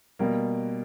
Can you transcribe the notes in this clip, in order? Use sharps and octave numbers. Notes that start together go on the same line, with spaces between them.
B2 G3 A#3